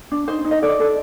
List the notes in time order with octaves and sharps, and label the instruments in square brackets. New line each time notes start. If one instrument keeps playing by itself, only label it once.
[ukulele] D4
D#4 C5
D#4
D#5
A4 D5
A4